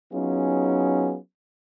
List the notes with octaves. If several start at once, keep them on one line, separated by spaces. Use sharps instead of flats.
F#3 B3 C#4 D#4 F4 G#4